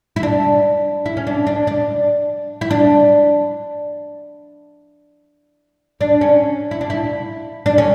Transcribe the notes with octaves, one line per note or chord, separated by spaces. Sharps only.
E4
D4
E4
C#4
D4
D4
D4
E4
D4
D4
C#4
E4
D4
E4
D4
C#4